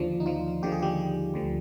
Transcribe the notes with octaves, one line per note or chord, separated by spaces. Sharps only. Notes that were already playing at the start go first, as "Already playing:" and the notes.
Already playing: D#2 D3 F3 D4
D#4
F3 F4
D#2 D3 F3 G4
G#4
G3 G4
D2 D3 F3